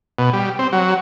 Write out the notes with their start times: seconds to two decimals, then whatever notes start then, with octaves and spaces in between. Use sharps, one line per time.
0.19 B2
0.33 G3
0.59 C4
0.72 F#3